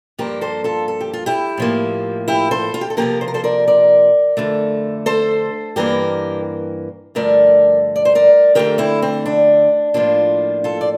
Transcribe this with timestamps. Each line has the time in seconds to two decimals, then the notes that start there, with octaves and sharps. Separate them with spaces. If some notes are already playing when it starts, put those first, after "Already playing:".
0.19 G2 F3 A#3 G4 A#4
0.41 A4 C5
0.64 F4 A4
0.88 A4
1.01 G4
1.13 F4
1.26 E4 G4
1.58 A2 F3 A#3
2.28 E4 G4
2.51 A4 C5
2.74 F4
2.81 G4
2.90 A4
2.97 C3 F3 A#3 G4 A#4
3.21 C5
3.28 A#4
3.34 A4 C5
3.44 A#4 D5
3.68 A#4 D5
4.37 F2 D3 A3
5.06 A4 C5
5.76 G2 E3 A#3 G4 A#4
7.15 G2 D3 F3 A3 A#4 D5
7.96 D5
8.05 C5
8.15 A#4 D5
8.55 F2 D3 A3 G4 A#4
8.78 C4 E4
9.02 C4
9.26 D4
9.94 A2 F3 A#3 D4 F4
10.64 F4 A4
10.81 D5